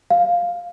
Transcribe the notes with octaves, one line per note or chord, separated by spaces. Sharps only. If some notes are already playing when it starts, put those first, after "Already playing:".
F5